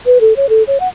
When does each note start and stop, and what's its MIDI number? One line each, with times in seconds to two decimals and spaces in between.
0.06 0.18 71
0.21 0.36 69
0.36 0.49 73
0.49 0.63 69
0.67 0.78 73
0.80 0.88 78